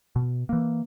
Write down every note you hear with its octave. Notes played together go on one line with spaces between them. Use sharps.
B2
E3 A#3